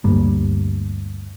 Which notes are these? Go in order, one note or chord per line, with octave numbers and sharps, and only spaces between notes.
D2 G2 G3 A#3